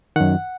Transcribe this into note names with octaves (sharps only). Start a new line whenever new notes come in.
F#2 D#3 F#5